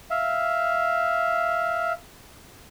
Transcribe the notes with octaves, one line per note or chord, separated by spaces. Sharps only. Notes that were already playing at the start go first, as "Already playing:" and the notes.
E5 F5